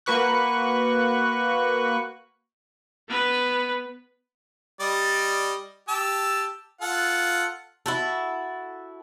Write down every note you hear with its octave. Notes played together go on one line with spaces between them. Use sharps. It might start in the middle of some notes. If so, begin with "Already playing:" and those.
A#3 F#4 B4 C#6 F#6
B3 B4
G3 D5 D#5
G4 A5 E6
F4 A4 F#5
E4 F#4 A4